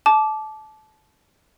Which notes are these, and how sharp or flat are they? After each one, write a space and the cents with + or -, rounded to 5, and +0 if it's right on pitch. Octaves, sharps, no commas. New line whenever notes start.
A5 -25 D6 -5